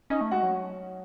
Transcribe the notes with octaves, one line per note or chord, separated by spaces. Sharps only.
C#4 D#4 D#5
A3
G#3 F#4 F#5
F#3